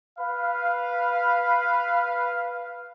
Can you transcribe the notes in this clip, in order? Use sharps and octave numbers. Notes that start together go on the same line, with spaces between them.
B4 F5